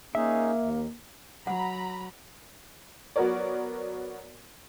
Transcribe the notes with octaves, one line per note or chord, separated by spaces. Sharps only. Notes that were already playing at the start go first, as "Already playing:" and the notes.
A#3 C#4 D#4 G#4 E5
D#2
F#3 F#5 A#5 B5
F#3 B3 F#4 A#4 C#5 D5